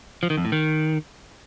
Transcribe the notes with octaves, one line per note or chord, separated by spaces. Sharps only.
F3
D#3
F2
A2
D#3